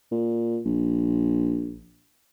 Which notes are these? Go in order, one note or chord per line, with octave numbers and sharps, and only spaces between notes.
A#2
A#1